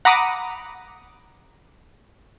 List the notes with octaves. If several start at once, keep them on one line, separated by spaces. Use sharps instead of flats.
F#5 A#5 B5 D6 D#6